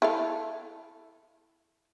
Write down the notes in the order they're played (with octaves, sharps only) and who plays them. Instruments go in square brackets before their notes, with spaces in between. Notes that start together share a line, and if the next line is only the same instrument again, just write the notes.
[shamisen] E4 A4 F5